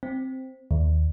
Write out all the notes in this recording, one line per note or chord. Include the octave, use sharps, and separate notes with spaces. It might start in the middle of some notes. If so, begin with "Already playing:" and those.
C4
D#2